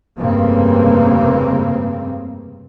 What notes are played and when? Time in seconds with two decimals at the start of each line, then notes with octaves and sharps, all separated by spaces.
0.19 F1 G2 C#3 A#3 C4